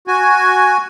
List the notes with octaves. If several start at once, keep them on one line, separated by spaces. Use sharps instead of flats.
F#4 G#5